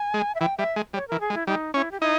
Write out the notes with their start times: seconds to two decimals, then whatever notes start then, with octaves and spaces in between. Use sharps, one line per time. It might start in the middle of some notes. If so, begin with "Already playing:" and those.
Already playing: G#5
0.14 G#3
0.35 E5
0.41 E3 G5
0.58 G3 E5
0.76 G#3
0.93 G3 C#5
1.08 E3 A#4
1.20 G#4
1.30 G#3
1.34 E4
1.47 G3 D#4
1.74 C#4 E4
1.91 G4
2.00 D#4 E4